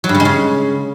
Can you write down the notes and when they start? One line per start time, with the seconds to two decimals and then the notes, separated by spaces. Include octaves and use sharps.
0.04 F#3
0.09 G2
0.15 C#3
0.20 G#3
0.25 C#3